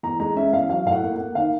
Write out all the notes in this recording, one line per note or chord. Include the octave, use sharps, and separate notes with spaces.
E2 A#5
G#3 A#5
C#4 E5
E2 F5
F#3 F5
A2 F5
F#5
A#3
F#5
A#3
D#3 F5